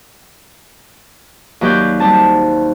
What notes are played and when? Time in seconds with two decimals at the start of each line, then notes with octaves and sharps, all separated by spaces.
1.61 D#2 F#3 G4 B4 D5 G6
2.00 G3 C4 A5